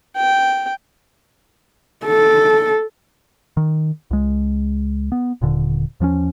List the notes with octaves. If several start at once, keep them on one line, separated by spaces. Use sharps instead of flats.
G5
A4
D#3
C#2 G#3
B3
D#1 A#2 D3
E2 F3 A#3 C#4